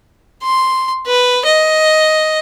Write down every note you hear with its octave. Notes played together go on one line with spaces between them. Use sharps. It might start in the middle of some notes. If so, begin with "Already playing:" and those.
C6
B4
D#5